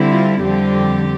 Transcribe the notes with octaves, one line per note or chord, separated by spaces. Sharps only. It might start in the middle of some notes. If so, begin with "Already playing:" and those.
Already playing: D3 G3 C4 E4
F4
F2 D3 G3 C4 G4